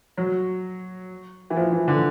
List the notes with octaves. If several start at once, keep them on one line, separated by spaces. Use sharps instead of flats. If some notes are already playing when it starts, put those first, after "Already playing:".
F#3
E3
F3
E3
D3